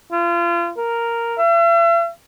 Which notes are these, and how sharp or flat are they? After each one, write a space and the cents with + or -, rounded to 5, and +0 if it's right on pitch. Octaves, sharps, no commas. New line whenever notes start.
F4 -35
A#4 -5
E5 +45